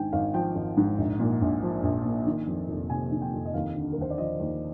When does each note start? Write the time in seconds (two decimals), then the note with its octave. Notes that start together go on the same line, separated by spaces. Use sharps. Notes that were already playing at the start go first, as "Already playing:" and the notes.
Already playing: G#1 G#2 G5 G#5
0.12 G#1 F5
0.34 F3 G5
0.55 G#1
0.77 G#2
0.98 A#1
1.20 A#2
1.41 A#1
1.63 F3
1.83 A#1
2.05 A#2
2.27 D#3
2.47 F2
2.69 F1
2.90 C3 G#5
3.12 D#3
3.22 G5
3.33 F2
3.45 D#5
3.54 D#2 F5
3.75 D3
3.92 A#4
3.97 D#2 C5
4.10 D5
4.18 F3 D#5
4.39 D#2